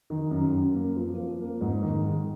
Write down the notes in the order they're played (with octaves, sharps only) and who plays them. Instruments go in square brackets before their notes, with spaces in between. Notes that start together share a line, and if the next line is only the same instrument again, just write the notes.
[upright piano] D#3
F#2
F#2
A#3
F3
F3
A#3
G#2
D#3
G#3